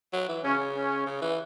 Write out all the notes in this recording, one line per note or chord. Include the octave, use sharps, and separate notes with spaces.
F#3
E3
C#3 C#4
C#4
C#3
E3